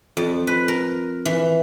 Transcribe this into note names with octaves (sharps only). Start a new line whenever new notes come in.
F2
B4
A#4
E3